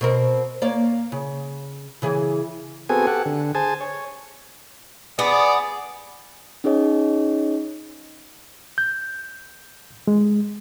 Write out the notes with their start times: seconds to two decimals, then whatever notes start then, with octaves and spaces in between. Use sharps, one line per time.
0.01 B2 C4 A#4
0.62 A#3 C#5 D5
1.12 C#3
2.02 C#3 E3 G#4
2.89 B3 C4 F#4 G#4 A4 G#5
3.07 G4 A4 F#5
3.26 D3
3.55 G#4 C5 G#5 A5
3.81 C#5
5.19 B3 G#4 D5
6.64 C#4 D#4 G#4 C#5 D#5
8.78 G6
10.07 G#3